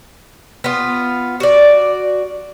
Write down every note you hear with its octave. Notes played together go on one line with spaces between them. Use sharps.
B3 F4
F#4 D5